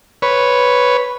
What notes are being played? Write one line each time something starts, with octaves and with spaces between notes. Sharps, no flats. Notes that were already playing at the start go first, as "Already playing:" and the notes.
B4 C#5